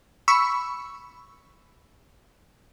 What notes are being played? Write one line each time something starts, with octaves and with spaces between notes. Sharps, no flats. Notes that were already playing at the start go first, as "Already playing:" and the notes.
B5 C#6 E6